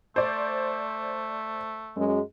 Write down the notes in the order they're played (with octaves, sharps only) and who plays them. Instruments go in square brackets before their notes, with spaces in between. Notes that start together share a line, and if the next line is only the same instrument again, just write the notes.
[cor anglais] A3 [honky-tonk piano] C5 D5
[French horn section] F#2 G#3